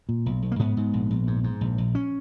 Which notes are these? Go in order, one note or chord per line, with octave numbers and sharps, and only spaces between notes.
A#2
B1
B1
A#3
G#2 B3
G#2
A#1
A#1
G#2
G#2
A#1
A#1
C#4